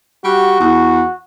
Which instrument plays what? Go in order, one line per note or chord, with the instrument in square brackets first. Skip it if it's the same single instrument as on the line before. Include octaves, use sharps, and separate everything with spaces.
[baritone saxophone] G3 [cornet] F#4
[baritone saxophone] E2